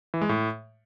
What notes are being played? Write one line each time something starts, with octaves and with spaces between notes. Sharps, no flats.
E3
G#3
A2